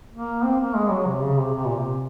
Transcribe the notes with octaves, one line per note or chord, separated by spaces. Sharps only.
A#3
C4
A#3
G#3
F#3
C3
C#3
C3
C3
A#2
C3